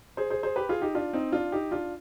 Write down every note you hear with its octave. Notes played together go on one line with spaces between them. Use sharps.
G#4 C5
G#4 C5
G#4 C5
G4 B4
F4 G#4
D#4 G4
D4 F4
C4 D#4
D4 F4
D#4 G4
D4 F4